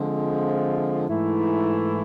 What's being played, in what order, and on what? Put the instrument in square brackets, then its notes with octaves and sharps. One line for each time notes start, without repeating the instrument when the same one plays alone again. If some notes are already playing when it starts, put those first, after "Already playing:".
Already playing: [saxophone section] D3 F3 G#3 C4 F4
G#2 E3 A3 E4